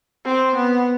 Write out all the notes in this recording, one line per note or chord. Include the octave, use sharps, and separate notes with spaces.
C4
B3